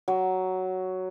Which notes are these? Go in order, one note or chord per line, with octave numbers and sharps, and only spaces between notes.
F#3